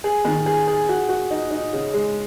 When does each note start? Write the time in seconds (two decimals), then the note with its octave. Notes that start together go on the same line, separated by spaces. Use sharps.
0.04 G#4
0.25 D#3
0.46 G#4
0.68 G#4
0.89 F#4
1.09 F#4
1.31 D#4
1.51 D#4
1.73 C#3
1.94 G#3